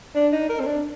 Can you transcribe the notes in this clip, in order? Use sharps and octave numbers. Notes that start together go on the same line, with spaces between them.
D4
D#4
A#4
C4
D4